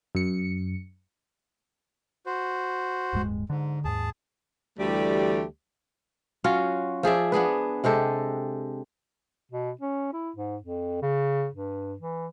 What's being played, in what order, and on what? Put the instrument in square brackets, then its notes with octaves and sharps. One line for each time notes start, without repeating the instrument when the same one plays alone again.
[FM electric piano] F#2 C#7
[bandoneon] F#4 C5
[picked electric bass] D1 G2 G#3
[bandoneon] G#2 [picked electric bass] D3
[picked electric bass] D#2 G#2 [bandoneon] G#4 A5
[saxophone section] D2 E3 G3 A3 G4 D5
[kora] F#3 C#4 F4 F#4
F3 G#4 D5 E5
B3 D4 G#4 B4
C3 G#3 G4 A4
[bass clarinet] B2
C#4
E4
G#2
F2
C#3
G2
E3